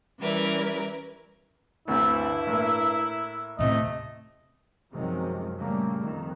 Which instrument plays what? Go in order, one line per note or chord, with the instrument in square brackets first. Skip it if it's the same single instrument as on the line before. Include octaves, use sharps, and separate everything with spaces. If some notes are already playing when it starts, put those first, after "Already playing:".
[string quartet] E3 G3 C#4 E4 A#4 B4
[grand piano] D2 C3 [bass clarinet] G2 [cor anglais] E4
[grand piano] A2 A#3
[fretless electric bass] D#2 A2 C3 [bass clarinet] A3 [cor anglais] D#5
[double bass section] F#2 C3 D#3 F3 F#3 G#3
A#2 C#3 G3 A3 A#3
F2 D#3